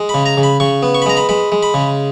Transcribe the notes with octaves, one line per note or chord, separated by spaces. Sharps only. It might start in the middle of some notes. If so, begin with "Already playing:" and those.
Already playing: G#3
B5
C#3
A#5
C#3
B5
C#3 C#6
B3
C#6
B5
G#3 A#5
B5
G#3 B5
G#3
B5
C#3